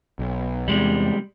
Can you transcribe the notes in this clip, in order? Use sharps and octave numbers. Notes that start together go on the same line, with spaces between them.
B1
E2 C3 G3 G#3